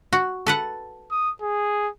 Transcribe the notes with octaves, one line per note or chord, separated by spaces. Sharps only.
F#4
A4 B4 F#5
D#6
G#4